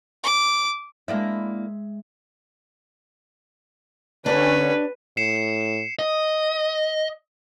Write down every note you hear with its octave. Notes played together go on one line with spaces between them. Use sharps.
D6
G#3 A#3 D4 E4 E5
D3 C#4 D4 G4 B4 C#5
A2 C7 C#7 E7
D#5